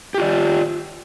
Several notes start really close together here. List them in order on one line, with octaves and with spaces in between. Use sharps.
G4 F4 D5